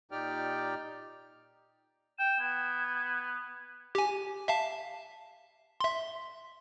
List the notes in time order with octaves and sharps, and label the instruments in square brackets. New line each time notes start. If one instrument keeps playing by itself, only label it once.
[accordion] A#2 D#4 G4 D5 G5 F6
[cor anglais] G5 [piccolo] E7
[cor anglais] B3 [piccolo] G#6
[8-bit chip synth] G4 G#5
E5 F5 A5
E5 C6